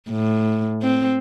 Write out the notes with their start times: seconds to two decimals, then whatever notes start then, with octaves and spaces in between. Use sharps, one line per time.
0.10 A2
0.82 C4